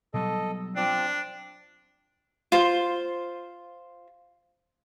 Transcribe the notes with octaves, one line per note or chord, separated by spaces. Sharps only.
B2 F#3 G3 A4 D#5
F3 C4 D4 D5
F4 C5